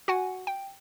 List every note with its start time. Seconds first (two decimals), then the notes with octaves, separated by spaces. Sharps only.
0.08 F#4 F#5 G#5
0.47 G5